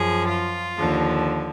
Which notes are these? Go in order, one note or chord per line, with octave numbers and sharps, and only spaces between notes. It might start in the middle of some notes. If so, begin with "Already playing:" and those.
Already playing: F#2 F3 G#4
F4
D#2 D3 F3